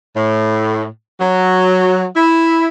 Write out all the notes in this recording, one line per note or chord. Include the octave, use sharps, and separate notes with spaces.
A2
F#3
E4